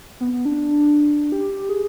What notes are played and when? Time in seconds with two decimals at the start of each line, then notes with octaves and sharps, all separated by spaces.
0.20 B3
0.33 B3
0.45 D4
1.32 G4
1.69 G#4